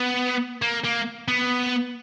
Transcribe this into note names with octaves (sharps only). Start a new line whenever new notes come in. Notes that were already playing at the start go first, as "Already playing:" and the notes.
Already playing: B3
A#3
A#3
B3